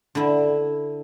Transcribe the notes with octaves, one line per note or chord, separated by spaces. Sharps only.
D3 E4